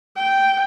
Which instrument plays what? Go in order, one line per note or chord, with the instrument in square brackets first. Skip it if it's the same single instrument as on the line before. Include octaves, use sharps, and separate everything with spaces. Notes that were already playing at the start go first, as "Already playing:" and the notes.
[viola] G5